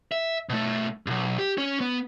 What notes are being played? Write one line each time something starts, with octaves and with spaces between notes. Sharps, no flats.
E5
B2 A3
B1 G2
G4
C#4 C#5
B3